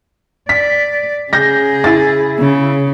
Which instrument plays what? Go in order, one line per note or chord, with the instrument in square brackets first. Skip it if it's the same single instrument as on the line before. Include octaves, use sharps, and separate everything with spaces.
[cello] D5 [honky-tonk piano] B6
[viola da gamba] C#3 [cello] G#4 [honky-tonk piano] G6 A#6
[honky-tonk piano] E4 A6
[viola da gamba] C#3